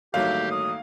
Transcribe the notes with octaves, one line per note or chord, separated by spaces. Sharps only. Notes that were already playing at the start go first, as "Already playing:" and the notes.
A1 G2 D#3 F#3 A3 A#3 G4 F5
D#6